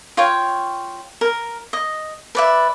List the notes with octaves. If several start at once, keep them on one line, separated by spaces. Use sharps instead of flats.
F4 C#5 G5
A#4
D#5
B4 D5 E5